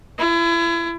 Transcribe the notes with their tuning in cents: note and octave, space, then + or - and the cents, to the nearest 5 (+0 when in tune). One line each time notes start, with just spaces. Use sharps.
E4 +35